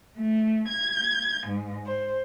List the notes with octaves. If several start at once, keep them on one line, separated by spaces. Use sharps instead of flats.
A3
G#6
G#2
C5